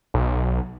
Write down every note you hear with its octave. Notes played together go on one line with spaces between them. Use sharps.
B1